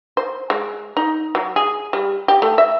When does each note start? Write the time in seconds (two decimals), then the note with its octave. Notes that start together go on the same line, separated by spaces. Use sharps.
0.17 C5
0.50 G#3
0.97 D#4
1.35 F#3
1.56 G#4
1.93 G3
2.28 G4
2.42 A3
2.58 E5